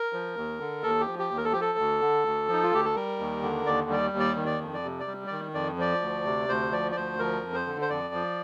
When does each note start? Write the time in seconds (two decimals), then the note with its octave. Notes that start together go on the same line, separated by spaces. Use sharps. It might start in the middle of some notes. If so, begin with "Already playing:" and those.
Already playing: A#4
0.13 F3
0.37 D#2
0.60 D3
0.83 D#2 A4
1.01 G4
1.08 F3
1.19 G4
1.31 D#2
1.37 A#4
1.45 A4
1.52 F3 G4
1.61 A4
1.78 D2
2.01 D3
2.25 D2
2.48 F3 D#4
2.63 F4
2.73 D2 G4
2.85 A4
2.95 G3 A#4
3.19 D#2
3.42 D3
3.66 D#2 D5
3.90 G3 D5
4.13 D#2
4.19 D5
4.36 D#3
4.46 D5
4.61 F2
4.74 D5
4.84 C3
5.00 D5
5.07 G3
5.27 D#3 D5
5.54 F2 D5
5.78 F3 D5
6.01 D2
6.25 C3
6.49 D2 C5
6.72 F3 D5
6.92 D5
6.96 D2 C5
7.19 F3 A#4
7.43 F2
7.54 C5
7.67 D3
7.82 C5
7.90 F2 D5
8.14 F3